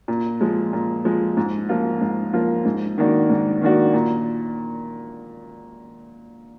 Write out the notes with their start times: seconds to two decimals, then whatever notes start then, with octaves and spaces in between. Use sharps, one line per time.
0.08 A#2
0.41 F3 G#3
0.73 A#2
1.05 F3 G#3
1.37 G#2
1.69 F3 A#3 F4
2.01 G#2
2.33 F3 A#3 F4
2.65 G#2
2.98 D#3 A#3 D4 F#4
3.30 G#2
3.61 D#3 A#3 D4 F#4
3.94 A#2